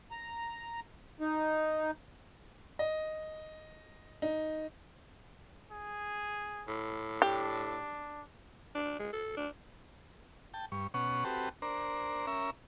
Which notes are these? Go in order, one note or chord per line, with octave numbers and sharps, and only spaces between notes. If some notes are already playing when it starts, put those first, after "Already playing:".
A#5
D#4
D#5
D#4
G#4
A2
D4 G4
D4
G#3
A4
D4
G5 A5
G2 C#6
B2 C#4 F#5 C#6
C4 F#4 G4 A4 B4
D4 A#4 C5
C#4 A#4 E5